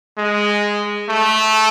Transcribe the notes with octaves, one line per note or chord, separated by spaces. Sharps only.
G#3
A3